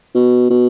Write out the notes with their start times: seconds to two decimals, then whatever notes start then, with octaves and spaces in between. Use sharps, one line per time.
0.15 B2
0.50 B2